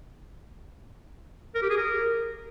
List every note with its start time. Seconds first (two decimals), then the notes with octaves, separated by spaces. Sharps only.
1.55 A#4
1.63 G4
1.70 G#4
1.78 A#4